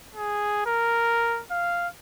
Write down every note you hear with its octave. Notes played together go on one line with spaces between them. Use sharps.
G#4
A#4
F5